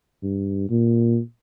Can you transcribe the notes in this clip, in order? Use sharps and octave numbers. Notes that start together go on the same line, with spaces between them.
G2
A#2